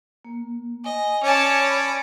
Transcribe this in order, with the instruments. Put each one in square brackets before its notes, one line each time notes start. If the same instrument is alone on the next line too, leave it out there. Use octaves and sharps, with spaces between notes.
[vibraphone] A#3
[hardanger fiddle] D#5 [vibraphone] G#5
[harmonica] C#4 D5 [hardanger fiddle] C#5 A5
[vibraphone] B5